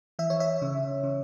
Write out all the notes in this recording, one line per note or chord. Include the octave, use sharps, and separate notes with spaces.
E3 E5
C#5
E5
C#3
C#3